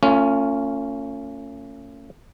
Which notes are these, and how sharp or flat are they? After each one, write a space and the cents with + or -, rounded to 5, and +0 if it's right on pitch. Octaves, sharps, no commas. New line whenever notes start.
A3 +45 C#4 +0 F4 +0